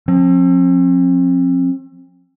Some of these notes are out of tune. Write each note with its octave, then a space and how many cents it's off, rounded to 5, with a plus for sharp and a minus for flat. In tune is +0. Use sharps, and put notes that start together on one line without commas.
F3 +35 C4 +40